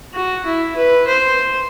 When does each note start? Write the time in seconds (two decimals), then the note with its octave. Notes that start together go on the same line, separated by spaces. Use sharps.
0.14 F#4
0.45 E4
0.76 B4
1.07 C5